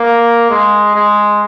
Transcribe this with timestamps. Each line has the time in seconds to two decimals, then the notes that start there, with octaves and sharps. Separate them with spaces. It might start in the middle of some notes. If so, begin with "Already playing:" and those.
Already playing: A#3
0.50 G#3
0.95 G#3